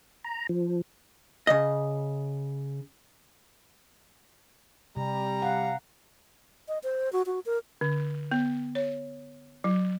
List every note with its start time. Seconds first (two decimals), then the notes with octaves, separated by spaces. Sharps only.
0.24 A#5
0.49 F3
1.47 C#3 D#5
4.97 C3 G3 A#5
5.42 F5 F#5
6.68 D#5
6.84 C5
7.13 F#4
7.26 F#4
7.46 A#4
7.81 D3
8.31 B3
8.75 C#5
9.64 F#3